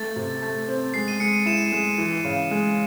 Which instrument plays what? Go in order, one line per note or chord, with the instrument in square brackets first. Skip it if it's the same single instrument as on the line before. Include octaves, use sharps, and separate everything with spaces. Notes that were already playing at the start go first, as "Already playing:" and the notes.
Already playing: [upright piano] A3 [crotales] A6
[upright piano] C3
A3
C4
[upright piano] G#3 [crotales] C7
[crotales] D#7
[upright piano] G#3 [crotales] C#7
[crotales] D#7
[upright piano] E4 [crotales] E7
[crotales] D#7
[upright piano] G#3 [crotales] E7
[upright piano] E3
C#3
G#3